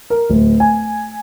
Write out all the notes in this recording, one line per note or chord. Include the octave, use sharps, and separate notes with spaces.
A#4
D1
G#5